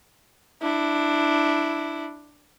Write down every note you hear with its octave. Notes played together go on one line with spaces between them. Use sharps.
D4 E4